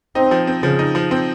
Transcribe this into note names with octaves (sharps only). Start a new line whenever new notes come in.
C4 D#4
F3
C4
C#3 F3
D#4
F3
C4